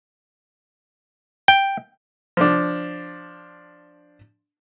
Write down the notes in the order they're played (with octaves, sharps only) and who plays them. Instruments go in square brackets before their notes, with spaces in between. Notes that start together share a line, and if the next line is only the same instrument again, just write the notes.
[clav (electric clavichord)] G5
[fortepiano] F3 D4